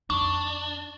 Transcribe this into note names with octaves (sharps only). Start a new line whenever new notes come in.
F2 D4 D#4 C#6